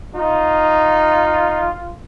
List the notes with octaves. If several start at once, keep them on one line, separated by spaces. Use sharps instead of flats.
D#4 F4